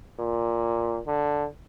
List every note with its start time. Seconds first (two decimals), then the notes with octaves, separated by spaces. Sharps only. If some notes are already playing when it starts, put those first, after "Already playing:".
0.19 A#2
1.07 D3